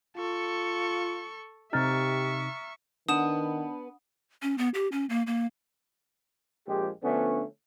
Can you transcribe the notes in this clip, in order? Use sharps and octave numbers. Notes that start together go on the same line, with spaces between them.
F4 A4 C#6
C3 D#4 G4 E5 A#5 C#6 F6 A6
D#3 B3 D4 D#6 E7
C#4
B3
G4
C#4
A#3
A#3
A#1 F3 G#3 G4
D3 F3 A3 B3 C#4 D4